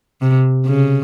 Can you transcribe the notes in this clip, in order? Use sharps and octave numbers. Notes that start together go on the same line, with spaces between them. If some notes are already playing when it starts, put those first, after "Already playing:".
C3
C#3